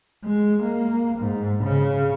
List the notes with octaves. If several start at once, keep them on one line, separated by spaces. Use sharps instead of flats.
G#3
A#3
G#2
C#3